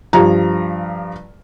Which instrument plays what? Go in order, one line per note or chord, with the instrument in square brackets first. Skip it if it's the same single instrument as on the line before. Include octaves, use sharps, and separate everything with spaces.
[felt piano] G2 F3 A#5